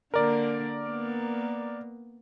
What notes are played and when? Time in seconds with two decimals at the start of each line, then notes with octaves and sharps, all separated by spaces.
0.14 D3 A#3 A#4 D5
0.86 A#3 B3